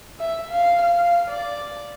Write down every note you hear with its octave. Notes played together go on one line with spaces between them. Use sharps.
E5
F5
F5
D5